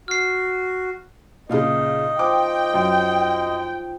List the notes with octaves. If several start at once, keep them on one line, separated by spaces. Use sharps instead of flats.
F#4 F6 C7
A#2 C#3 D#4 D#5 F5 D6
F3 G5 D6
F#2